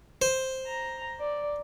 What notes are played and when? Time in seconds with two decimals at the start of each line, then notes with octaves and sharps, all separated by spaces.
0.22 C5
0.67 A#5
1.20 D5